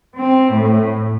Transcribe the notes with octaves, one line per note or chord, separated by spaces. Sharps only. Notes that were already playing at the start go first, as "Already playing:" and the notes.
C4
A2